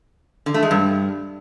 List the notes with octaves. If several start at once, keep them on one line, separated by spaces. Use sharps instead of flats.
D3
A3
G#3
G2